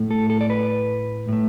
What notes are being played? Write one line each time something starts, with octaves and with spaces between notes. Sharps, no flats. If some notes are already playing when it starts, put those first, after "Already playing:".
Already playing: A2 A3
A4
A4
D5
B4
A2 A3